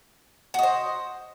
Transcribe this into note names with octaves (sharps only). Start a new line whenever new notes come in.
F#4 C5 D#5